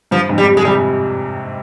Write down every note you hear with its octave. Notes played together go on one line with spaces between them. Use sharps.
G2 F3
F2 G#2
G3
G#3
C3 G3